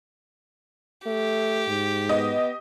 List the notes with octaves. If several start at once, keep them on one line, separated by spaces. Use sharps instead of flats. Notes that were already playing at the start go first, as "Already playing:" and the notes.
A3 G4
G#2
B3 D#5